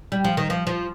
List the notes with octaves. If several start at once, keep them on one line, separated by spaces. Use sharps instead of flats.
G3
F3
D#3
F3
F3